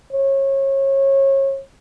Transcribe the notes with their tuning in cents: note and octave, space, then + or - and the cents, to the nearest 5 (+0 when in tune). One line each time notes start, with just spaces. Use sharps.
C#5 -30